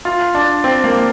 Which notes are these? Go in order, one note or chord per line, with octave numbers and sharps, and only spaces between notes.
F4
D4
C4
A#3